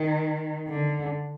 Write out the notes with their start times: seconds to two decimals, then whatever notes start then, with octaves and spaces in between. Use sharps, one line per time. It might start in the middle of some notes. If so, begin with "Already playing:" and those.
Already playing: D#3
0.68 D3